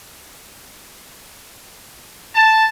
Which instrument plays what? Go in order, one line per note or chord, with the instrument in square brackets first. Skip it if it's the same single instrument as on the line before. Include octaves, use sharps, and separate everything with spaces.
[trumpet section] A5